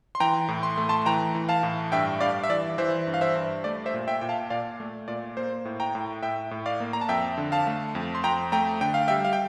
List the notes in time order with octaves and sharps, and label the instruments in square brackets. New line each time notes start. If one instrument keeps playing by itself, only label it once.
[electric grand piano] C6
E3 G5 A#5
A2
C6
A3
A5 C6
E3 G5 A#5
E3
F5 A5
A2
G2 E5 G5
G2 D5 F5
E5
E3 D5
E3 C5 E5
G2
F5
C5 E5
G2
A3 D5
C5 E5
A#2
E5 G5
A#2 G5
F5 A5
A#2 D5 F5
A3
A#2 D5
A#3 C5
A2
G5 A#5
A2
A2 E5 G5
A2
D5 F5
A#3
A#5
A5
F2 E5 G5
D3
F5 A5
A3
F2
C6
F2 G5 A#5
A3 G5 A#5
D3 G5
F5
G3 E5 G5
F5
G5